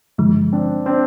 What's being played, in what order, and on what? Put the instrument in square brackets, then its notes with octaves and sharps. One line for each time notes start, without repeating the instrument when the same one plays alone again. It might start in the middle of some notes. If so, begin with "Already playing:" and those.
[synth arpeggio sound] G2 D3 F3 G#3
[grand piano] C4 D4
C4 D4